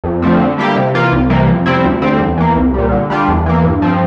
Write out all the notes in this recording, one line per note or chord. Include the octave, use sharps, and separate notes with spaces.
F2
D3 F3 A3 C4
D3
G3 A#3 E4 G4
C3
E3 A#3 F4
C2
C3 E3 G3 A#3
F2
C3 G3 C4 E4
D2
D3 G3 C4
E2
E3 A#3
C2
A#2 G3
D3
G3 D4 F4
E2
E3 A#3
G2
F3 C4